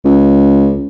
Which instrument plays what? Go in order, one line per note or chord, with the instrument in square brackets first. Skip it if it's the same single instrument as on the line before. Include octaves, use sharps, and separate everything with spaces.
[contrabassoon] C#2